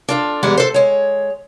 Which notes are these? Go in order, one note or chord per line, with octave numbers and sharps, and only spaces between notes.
D4 F4 A4
E2 G#2 G3 G#3 F#5
A4 C5
G#3 C#5